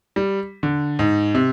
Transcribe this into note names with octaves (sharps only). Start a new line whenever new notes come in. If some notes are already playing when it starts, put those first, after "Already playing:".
G3
D3
G#2
C3